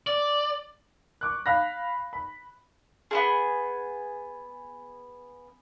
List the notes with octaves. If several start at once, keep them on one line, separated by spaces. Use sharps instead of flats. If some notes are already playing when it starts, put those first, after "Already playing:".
D5
C#6 D6 F#6
F5 B5 F#6 A#6
B5
B3 E4 G#4